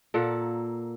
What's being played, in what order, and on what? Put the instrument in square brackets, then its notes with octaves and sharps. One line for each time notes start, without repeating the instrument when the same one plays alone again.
[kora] A#2 A#3 A4 F#5